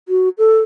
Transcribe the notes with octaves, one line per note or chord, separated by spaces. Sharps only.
F#4
A4